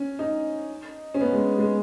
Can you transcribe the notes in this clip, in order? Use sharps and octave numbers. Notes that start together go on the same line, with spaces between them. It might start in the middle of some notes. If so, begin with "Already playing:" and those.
Already playing: C#4
D#4
C#4
B3
G#3
G#3